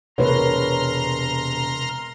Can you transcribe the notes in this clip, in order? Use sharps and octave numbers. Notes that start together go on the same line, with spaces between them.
E1 C3 A#4 B4 C#5 A#5 C6 F6